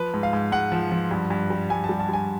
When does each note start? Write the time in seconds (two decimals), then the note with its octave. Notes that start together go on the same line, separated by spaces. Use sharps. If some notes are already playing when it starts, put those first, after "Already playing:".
Already playing: F3 B4
0.14 G#2
0.23 F5
0.33 G#2
0.52 G#2 F#5
0.72 F3
0.91 F3
1.11 G2
1.30 G2
1.50 G3
1.70 G2 G#5
1.84 A5
1.89 G3
1.99 A5
2.09 G2 G#5